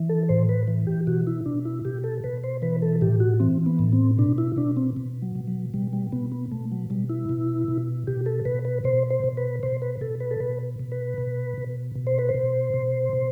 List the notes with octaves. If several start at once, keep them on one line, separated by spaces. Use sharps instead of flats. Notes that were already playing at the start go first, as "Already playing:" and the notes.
Already playing: E3
A4
A2 C5
B4
E3
G4
B2 F#4
E4
B2 D4
E4
B2 G4
A4
B2 B4
C5
E3 B4
A4
A2 G4
F#4
E3 C4
B3
A2
C4
B2 D4
E4
B2 D4
C4
B2
F#3
B2
F#3
B2 G3
G3
B2 B3
B3
B2 A3
F#3
B2 G3
E4
B2
B2
B2 G4
A4
B2 B4
B4
B2 C5
C5
B2
B4
B2 C5
B4
B2 A4
B4
A4
B2 B4
B2
B4
B2
B2
B2
C5
B4
C5
B2
B2
B2